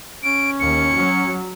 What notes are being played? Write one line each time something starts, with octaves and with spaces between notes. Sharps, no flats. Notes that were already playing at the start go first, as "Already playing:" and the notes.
C#4 D7
D#2 C#7
F#3